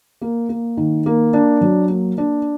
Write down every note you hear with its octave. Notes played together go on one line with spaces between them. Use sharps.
A#3
A#3
D#3
A#3
D4
F#3
A#3
D4